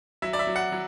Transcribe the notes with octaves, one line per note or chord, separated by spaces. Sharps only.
F#3 E5
D5
E5
F#3
F#5
F#3